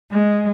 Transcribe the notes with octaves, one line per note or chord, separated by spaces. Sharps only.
G#3